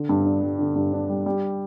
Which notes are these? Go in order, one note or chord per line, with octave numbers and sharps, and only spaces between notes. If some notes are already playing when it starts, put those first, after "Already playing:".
Already playing: D3
G2
D4
G3
D3
G2
D4
G3
G3